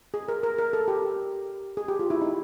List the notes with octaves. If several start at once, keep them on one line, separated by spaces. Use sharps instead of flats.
G#4
A#4
A#4
A#4
A4
G4
G#4
G4
F4
E4
D#4